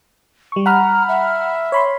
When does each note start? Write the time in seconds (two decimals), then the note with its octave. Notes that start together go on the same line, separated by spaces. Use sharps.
0.52 G3 C#6
0.66 F#5 A#5 B5 F6
1.09 E5
1.72 C#5 B5 C6